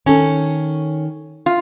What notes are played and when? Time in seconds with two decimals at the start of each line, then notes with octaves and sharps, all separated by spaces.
0.06 D#3 C#4 A4
1.46 F4